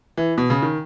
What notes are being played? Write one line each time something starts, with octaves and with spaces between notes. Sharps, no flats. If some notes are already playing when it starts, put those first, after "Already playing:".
E3
B2
C#3
D#3